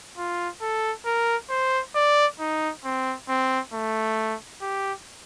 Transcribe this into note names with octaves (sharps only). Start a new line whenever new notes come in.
F4
A4
A#4
C5
D5
D#4
C4
C4
A3
G4